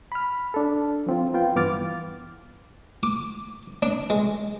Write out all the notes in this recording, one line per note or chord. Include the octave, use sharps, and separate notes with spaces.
B5 F6
D4 A4
F3 C4 F4
B3 F4 G5
G2 E3 B3 D6 F6 A6
D6
D4
G#3